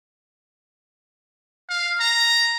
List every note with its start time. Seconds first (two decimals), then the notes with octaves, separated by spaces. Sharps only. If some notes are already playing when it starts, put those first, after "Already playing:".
1.69 F5
2.00 A#5